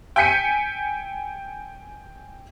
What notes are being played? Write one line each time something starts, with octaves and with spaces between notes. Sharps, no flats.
G5 G#5 G6 B6 C#7 D#7